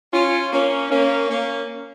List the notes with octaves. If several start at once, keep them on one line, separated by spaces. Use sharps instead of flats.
C#4 F4
A#3 C#4
A#3 C#4
A#3 C#4